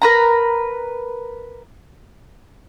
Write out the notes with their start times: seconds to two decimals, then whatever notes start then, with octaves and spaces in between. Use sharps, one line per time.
0.02 A#4 B4 A#5